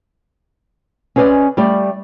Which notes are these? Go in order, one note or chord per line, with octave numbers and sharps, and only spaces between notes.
C#4 G#4 B4 C5 D5 D#5
G3 A3 G4 D5